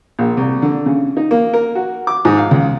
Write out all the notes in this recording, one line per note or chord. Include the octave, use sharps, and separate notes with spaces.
A#1
C2
D3
C#3
D#4
A#3
A#4
F#4
D6
G#2
F5
C#2